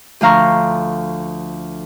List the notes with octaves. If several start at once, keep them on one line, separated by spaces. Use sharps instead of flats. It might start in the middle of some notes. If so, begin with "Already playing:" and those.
D2 F3 F5 A#5 C#6